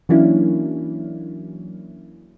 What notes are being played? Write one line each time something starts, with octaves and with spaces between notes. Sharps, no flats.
E3 F#3 A#3 C#4 D4 E4